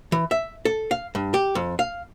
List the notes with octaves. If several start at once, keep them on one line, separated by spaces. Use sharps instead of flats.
E3
E5
A4
F5
G2
G4
F2
F5